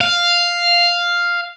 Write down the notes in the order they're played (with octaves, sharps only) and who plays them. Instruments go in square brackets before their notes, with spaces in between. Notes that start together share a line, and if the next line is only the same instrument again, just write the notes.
[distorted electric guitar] F5